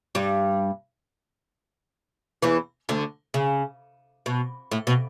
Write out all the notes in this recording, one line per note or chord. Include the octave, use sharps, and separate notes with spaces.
G2 G3
E2 E3
D2 D3
C#3
B2
A2
B2